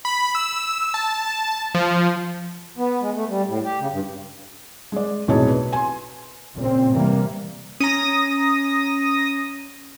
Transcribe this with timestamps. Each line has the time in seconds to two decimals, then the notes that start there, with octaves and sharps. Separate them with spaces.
0.05 B5
0.35 E6
0.94 A5
1.75 F3
2.78 B3
3.01 G#3
3.15 A3
3.29 G3
3.47 A2
3.64 G4
3.79 C#3
3.92 G2
4.92 G#3 D5
5.28 F1 B1 A2 G#4 C#5 A5
5.48 B4
5.73 G#5 C6
6.55 A#2 C#3 C4
6.92 C3 E3 G3 A#3
7.80 C#4 A#5 D#6 A#6